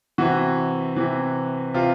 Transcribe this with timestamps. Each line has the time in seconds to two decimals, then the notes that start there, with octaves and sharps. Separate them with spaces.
0.18 C3 E3 F#4
0.96 C3 E3
1.74 C3 F4